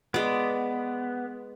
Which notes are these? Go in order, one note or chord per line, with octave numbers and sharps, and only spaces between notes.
G#3 B3 D5